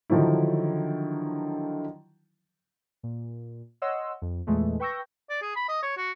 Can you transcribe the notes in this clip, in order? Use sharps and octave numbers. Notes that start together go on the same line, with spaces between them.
D3 D#3 F3 F#3 E4
A#2
C#5 D#5 F#5 C6 E6
F2
E2 A#2 E3 G#3 A3
B4 G5 C#6 E6 G6 A#6
D5
G#4
B5
D#5
C#5
F#4